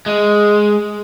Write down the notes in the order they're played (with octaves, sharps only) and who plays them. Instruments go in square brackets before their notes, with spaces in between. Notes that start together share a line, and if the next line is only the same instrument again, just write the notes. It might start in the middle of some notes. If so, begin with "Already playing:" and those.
[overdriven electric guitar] G#3